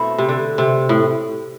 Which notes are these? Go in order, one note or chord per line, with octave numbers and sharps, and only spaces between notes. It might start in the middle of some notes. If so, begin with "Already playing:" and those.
Already playing: B2 A3 C4 E4
C3
D3
C3
A2